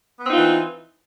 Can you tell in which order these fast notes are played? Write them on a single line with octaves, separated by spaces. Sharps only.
B3 C4 D#4 F4 E3